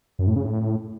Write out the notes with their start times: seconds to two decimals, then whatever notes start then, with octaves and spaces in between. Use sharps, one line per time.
0.19 F#2
0.27 A2
0.36 C#3
0.44 A2